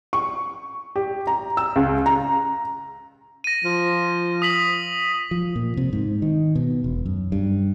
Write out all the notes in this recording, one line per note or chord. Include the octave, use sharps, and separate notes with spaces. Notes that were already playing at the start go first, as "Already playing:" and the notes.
C#6
G4
A#5
E6
C#2
A#5
A#6 D#7
F3
D#6 B6 F#7
F3
A#2
C3
G#2
D#3
B2
E1
F#2
G2